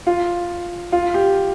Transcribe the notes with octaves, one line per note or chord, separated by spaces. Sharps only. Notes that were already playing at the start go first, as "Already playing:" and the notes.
F4
F4
G4